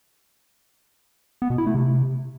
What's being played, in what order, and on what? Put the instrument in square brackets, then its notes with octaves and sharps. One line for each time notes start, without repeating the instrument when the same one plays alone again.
[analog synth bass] B3
B2
E4
A3
C3